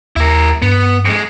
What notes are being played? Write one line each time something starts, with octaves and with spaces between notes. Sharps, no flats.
D#2 E4 A#4
G2 B3
F2 G#3